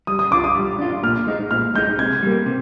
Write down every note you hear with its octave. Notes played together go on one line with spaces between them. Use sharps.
G3 D#6
D#6
D4 F4 D6
D#6
G3
D4 F4
A#2 F6
G#3 D#4
A#2 F6
G#3 D#4 G6
C3 G#6
G3 A#3
C3